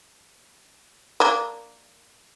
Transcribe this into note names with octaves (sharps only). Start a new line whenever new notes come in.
A#3 D4